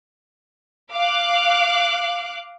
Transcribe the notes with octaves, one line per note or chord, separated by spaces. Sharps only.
F5 D6 F#6